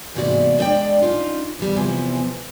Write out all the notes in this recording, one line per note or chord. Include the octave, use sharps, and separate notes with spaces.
E2 G#2 C3 A#3 F#4 D5
G#3 D4 B4 D5 G5
C#4 D#4 F4
E2 G3
E2 C3 E3 F3 G#5